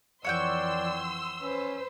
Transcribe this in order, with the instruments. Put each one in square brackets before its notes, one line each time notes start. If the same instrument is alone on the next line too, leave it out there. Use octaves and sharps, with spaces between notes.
[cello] F2 E3 [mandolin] C#5 F#5 G5 [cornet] D5 [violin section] C6 E6
[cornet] C#4 [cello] B4 C5